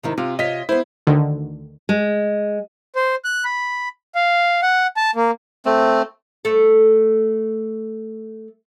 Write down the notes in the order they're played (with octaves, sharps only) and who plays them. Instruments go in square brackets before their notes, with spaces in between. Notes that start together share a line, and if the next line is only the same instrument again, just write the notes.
[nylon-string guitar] C3 D#3 E4
[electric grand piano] C3 [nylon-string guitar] F4
[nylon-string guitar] C3 F4 C#5 [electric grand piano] D#5 B6
[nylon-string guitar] B3 C5 [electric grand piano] E4
[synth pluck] D2 D3 D#3
[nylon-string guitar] G#3
[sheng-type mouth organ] C5
F#6
B5
F5
F#5
A5
A#3
[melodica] A3 C4
[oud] A3 A4